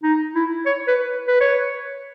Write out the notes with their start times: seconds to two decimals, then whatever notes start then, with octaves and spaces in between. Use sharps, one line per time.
0.03 D#4
0.35 E4
0.66 C#5
0.88 B4
1.28 B4
1.41 C#5